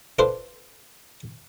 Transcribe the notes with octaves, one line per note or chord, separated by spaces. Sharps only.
D4 F4 A4 B4 C5